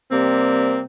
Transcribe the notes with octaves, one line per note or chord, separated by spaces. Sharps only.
C3 G3 A#3 C4